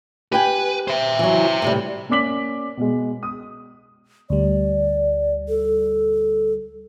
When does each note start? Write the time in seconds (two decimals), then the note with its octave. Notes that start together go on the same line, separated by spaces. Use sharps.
0.32 G4 B4 G5 G#5
0.88 C5 E5
1.19 E3 F#3
1.62 A2 C3 G3
2.09 A#3 C#4 D5 D6 B6 F#7
2.77 B2 G#3
3.23 D#6
4.30 D2 G3 D5
5.49 A4